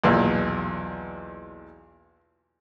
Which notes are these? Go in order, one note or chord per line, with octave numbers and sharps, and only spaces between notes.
B1 E2 A#2